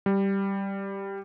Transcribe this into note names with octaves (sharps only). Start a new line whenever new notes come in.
G3